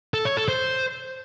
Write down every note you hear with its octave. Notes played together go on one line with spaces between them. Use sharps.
A4
C#5
A4
C5